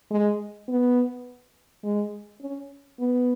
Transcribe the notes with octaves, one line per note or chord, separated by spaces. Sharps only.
G#3
B3
G#3
C#4
B3